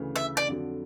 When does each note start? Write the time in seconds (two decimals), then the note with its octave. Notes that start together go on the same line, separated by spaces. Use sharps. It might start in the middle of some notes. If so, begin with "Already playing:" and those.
Already playing: D2 C#3 E3
0.16 E5
0.37 D5
0.48 F2 D3 F#3